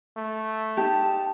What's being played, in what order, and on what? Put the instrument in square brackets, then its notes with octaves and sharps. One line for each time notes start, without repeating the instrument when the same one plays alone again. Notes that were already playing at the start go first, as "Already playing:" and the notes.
[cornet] A3
[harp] D#4 G4 [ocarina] A5